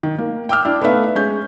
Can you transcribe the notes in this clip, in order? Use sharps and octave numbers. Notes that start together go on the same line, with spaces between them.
D#3
A#3
G5 D6 E6 F6
D4 E4
A3 B3 D#4 B4 E5 F5
G#3 C#4 G6